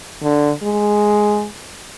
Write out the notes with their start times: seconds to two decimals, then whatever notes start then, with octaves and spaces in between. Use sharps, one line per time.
0.23 D3
0.63 G#3